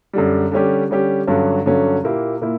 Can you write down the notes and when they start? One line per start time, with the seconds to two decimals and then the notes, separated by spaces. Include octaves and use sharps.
0.13 F#2 D3 G3
0.51 D3 G3 C#4 G4
0.90 D3 G3 C#4 G4
1.27 G2 D3 F#3 C#4
1.66 G2 D3 F#3 C#4
2.04 A#2 A#3 E4 G4
2.41 A#2 A#3 E4